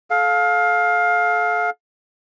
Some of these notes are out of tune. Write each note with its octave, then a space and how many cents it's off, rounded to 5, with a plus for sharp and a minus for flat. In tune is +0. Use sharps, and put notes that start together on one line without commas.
A4 -30 F5 +20